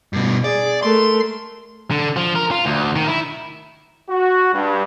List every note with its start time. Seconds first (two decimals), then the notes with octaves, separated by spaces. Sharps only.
0.13 G2 B2
0.44 G#4 D5
0.83 A3 A#4 C6
1.91 D3
2.16 F3
2.35 A#4
2.51 F4
2.66 D2
2.96 D#3
3.08 E4
4.09 F#4
4.54 G2